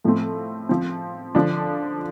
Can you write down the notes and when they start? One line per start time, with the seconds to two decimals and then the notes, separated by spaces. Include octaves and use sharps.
0.04 A2 F3 A3 C4
0.69 F3 C4
1.35 D3 F3 D4